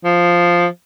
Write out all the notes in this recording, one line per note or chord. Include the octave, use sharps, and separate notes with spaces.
F3